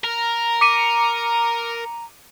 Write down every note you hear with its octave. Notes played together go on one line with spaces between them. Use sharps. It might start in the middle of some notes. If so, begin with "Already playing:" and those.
A#4 A#5
D6 C#7 D#7